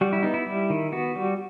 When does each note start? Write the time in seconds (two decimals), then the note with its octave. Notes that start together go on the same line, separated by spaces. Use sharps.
0.01 G3 F#4
0.13 E4
0.23 B3 D#4
0.34 E4
0.47 G3
0.70 D#3
0.92 B3 F#4
1.15 G3